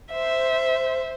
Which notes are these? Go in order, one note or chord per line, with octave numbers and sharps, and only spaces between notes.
C5 E5